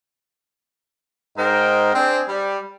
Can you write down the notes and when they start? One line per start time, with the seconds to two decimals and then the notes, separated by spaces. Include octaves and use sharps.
1.37 G#2 D#4 A#4 C5 D#5 G5
1.94 C4 D4 G#4
2.28 G3